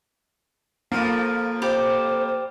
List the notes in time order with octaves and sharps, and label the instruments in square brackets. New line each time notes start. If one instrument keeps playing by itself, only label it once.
[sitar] F2 F3 [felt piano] A#3
[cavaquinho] G4 D5 B5 [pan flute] C5